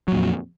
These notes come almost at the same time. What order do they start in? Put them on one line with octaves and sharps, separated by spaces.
F#3 A#2 F2